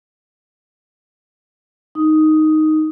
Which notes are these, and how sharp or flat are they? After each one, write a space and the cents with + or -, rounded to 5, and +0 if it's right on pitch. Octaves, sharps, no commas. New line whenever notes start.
D#4 +0 D#6 +5